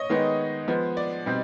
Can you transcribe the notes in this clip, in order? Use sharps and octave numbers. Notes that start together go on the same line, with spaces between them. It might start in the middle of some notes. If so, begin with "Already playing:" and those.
Already playing: C#5 D#5
D#3 G#3 B3 D#4
F3 G#3 B3
D5
B2 G3 C4 D#4